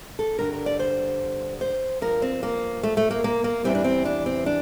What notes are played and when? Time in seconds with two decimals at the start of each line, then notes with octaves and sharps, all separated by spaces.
0.19 A4
0.39 G2 D3 G3 A#4
0.53 A#4
0.66 D5
0.79 C5
1.61 C5
2.02 G2 F3 A#4
2.22 C4
2.43 A#3
2.83 A3
2.97 A3
3.11 A#3
3.24 A#3
3.44 A#3
3.64 E2 E3 G3 C4
3.75 D4
3.84 C4
4.05 D4
4.26 C4
4.46 D4